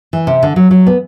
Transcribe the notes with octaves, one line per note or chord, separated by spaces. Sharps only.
E3
C3
D3
F#3
F#3
B3